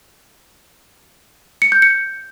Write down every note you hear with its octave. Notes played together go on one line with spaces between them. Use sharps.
C#7
G6
C#7